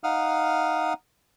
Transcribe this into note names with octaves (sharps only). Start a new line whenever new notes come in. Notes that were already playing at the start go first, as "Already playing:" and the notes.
D#4 F5 F#5 D#6 F6